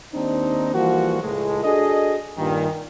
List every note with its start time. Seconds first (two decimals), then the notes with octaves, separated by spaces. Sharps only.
0.14 D#2 C4 D4 D#4
0.74 E3 F3 G3 A#3 F#4
1.22 C#2 A2 G#3
1.63 D4 F#4 G#4 A4 D#5
2.38 G2 A#2 D#3